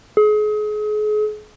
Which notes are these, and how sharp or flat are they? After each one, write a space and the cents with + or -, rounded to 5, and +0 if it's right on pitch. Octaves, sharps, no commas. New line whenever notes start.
G#4 +35